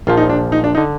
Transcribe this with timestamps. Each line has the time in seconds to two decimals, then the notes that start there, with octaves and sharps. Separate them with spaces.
0.07 A#1 A#2 F3 F4
0.17 D#4
0.29 D4
0.52 D#4
0.64 D4
0.75 D#4
0.77 D3